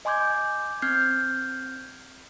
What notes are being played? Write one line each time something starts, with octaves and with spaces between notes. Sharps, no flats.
D#5 G#5 C6 D6 G6 G#6
C4 F6 G6 G#6 C7